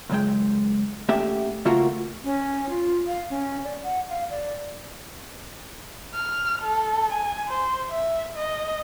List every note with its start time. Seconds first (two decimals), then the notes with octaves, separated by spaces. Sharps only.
0.10 C#2 F#2 C3 G#3 G5
1.09 A3 A#3 C#4 G4 E5 F#5
1.65 C#3 A3 A#3 F4 F#4 A#4
2.24 C#4
2.69 F4
3.07 F5
3.30 C#4
3.64 D5
3.83 F#5
4.10 F5
4.30 D5
6.15 F6
6.62 A4
7.12 G#5
7.48 C5
7.90 E5
8.35 D#5